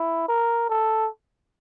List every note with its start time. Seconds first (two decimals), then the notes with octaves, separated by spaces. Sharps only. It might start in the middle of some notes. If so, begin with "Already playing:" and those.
Already playing: E4
0.28 A#4
0.69 A4